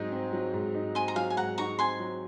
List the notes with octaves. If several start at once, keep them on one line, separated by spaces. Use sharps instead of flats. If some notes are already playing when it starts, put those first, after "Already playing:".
Already playing: G#2 F#3 C4 D#4
C4
F#3
G#2
D#4
C4 G#5 C6
A#5
F#3 F5 G#5
G#5
G#2 F#5 A#5
D#4 A#5 C#6
C4 G#5 C6
F#3